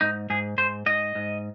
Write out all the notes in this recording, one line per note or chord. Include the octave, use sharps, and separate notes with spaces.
G#2 D#4
G#2 G#4
G#2 C5
G#2 D#5
G#2